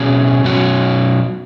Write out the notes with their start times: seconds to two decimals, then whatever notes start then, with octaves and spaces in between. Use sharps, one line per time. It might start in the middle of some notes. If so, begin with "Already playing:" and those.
Already playing: B2 F#3 C#4 G#4
0.44 B2 F#3 C#4 F#4